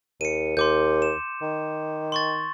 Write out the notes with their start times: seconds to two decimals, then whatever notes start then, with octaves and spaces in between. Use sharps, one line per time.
0.21 D#2 C#7 D#7
0.57 D#2 C6 D6 G6
1.02 E7
1.42 D#3
2.12 C6 C#6 A6